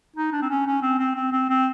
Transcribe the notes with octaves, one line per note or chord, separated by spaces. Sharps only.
D#4
D4
C4
C#4
C#4
C4
C4
C4
C4
C4